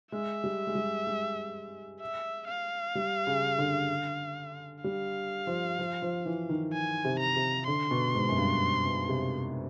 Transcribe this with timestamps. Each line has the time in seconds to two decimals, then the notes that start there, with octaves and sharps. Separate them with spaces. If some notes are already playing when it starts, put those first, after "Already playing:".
0.12 G#3 E5
0.44 G3
0.67 G#3
0.75 G3
1.07 G#3
2.01 E5
2.48 F5
2.95 G3
3.27 C#3
3.58 D3
4.84 G3 F5
5.47 F3
5.79 F3
6.02 F3
6.26 E3
6.49 D#3
6.73 G#5
7.05 C3
7.20 A#5
7.36 C3
7.67 D3 C6
7.91 B2
8.15 G#2
8.29 F#2
8.38 G2
8.86 B2
9.09 C3